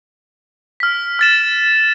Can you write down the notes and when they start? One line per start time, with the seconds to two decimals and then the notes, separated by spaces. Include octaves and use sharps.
0.80 F6 B6
1.19 F6 A6 E7